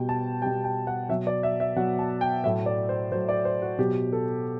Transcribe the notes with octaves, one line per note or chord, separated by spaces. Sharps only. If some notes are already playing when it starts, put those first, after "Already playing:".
Already playing: B2 G3 G5
A5
B2 G3 G5
G5
F#5
B2 F#3 E5
D5
E5
E5
B2 F#3 F#5
A5
G5
A2 F#3 E5
D5
C5
A2 F#3 C5
D5
C5
F#4
B2 F#3 G4
A4